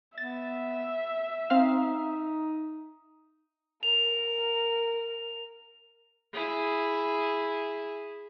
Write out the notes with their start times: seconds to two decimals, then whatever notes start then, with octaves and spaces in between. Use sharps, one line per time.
0.18 B3 E5 A6
1.50 C4 D#4 F5 F6
3.83 A#4 F7
6.34 E4 G#4